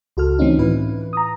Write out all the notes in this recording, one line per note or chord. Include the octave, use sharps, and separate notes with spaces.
C#2 F#4 A4 F6
E3 A3 C4 C#4 D#4 F4
A2 E3 E4 B4
A#5 D#6